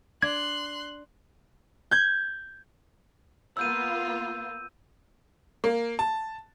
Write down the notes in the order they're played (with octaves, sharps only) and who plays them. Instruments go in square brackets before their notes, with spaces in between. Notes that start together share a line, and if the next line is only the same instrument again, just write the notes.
[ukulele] D4 [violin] C6 F#6 [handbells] G#6
[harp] G6 G#6
[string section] A#3 B3 F4 [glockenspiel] E6 G6 D#7
[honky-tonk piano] A#3
A5